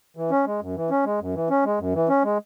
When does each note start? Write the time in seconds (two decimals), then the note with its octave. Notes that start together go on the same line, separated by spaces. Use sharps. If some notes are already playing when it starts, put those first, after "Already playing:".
0.17 E3
0.31 C#4
0.46 G#3
0.61 F#2
0.76 E3
0.90 C#4
1.05 G#3
1.20 F#2
1.35 E3
1.50 C#4
1.65 G#3
1.79 F#2
1.94 E3
2.09 C#4
2.24 G#3